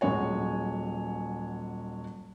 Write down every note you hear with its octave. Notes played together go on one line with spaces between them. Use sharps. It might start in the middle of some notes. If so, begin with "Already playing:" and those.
D#1 F#3 G#3 C#5 G#5